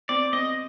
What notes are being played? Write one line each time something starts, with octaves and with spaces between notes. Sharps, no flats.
C4 D5
C4 D#5